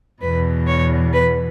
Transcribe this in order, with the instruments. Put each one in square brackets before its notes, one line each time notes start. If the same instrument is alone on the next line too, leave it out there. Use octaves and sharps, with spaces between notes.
[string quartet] E2 B2 B4
C#5
B4